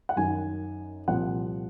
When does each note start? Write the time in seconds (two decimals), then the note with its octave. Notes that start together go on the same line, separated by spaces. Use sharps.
0.09 F#5
0.16 F#2 D#3 F#3 G#5
1.08 C2 A#2 F3 F#5